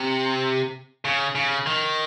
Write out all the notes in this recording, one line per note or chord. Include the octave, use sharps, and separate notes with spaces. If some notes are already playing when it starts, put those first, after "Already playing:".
Already playing: C3
C#3
C#3
D#3